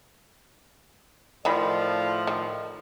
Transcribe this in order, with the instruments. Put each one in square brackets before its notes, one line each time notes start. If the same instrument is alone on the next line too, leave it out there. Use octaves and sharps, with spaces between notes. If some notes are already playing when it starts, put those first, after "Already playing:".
[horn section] A2 F3 [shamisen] D#3 B5 [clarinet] D5
[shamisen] D#3